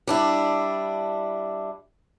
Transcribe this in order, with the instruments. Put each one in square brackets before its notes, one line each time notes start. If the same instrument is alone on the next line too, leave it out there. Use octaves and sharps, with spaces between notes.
[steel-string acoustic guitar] G3 D4 E4